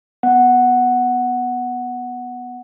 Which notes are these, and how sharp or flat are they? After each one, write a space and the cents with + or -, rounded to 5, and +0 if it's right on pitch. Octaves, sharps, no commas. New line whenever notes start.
B3 +0 F#5 +0